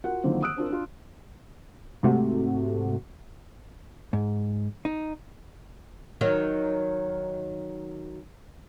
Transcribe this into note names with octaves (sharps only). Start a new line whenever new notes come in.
F4 F#4 A#4 F#5
D3 D#3 F3 F#3 A#3 C4
D#6 E6 F#6 D7
C4 D4 F4 A#4
D4 F4
G#2 C3 A3 F#4
G#2
D#4
D#3 F#3